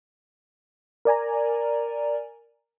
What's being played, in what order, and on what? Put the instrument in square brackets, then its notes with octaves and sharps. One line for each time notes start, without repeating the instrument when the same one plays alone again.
[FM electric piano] A#4 D5 G#5 A#5